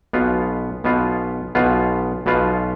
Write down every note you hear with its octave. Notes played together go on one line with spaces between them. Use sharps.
B1 B2 B3 F4
B1 B2 B3 F4
B1 B2 B3 F4
B1 B2 B3 F4